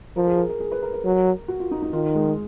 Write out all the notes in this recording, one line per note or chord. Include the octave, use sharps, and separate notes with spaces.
F3 A#4
G#4
A#4
A#4
G#4
B4
A#4
A#4
F#3
F#4
F4
D#4
D#4
D#3 F4
G#3